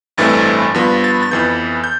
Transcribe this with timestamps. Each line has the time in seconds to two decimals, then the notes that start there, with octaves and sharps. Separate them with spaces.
0.18 A1 G2 E3 A3 C4 A6
0.74 G2 F3 B3
1.04 A6
1.23 A6
1.31 F2 E3 B3 G6
1.84 G6